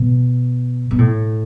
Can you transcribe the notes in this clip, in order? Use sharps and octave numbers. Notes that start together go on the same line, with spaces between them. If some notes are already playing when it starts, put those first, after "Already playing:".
Already playing: B2
B2
A2